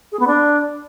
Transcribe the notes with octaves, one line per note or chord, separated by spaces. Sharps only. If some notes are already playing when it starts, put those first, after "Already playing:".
G#4
B3
D4